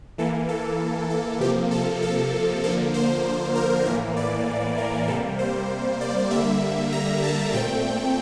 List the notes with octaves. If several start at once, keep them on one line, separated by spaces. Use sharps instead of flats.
E3 A#3 A4
A4
A4
C3 F3 A#3 G4
A4
A4
D3 F3 A#3 A4
C5
A#4
A2 E3 A#3 A#4
D5
A#4
C3 G3 A#3 A4
C5
D5
D3 G3 A#3 E5
A#5
A5
A#2 A3 C4 G5